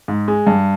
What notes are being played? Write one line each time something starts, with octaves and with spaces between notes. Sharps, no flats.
G#2
G#3
G2